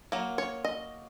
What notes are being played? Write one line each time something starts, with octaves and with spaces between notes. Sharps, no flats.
F#3 A#3
C#5
D#5